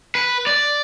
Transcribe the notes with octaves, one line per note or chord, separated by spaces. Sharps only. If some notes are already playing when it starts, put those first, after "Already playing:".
B4
D5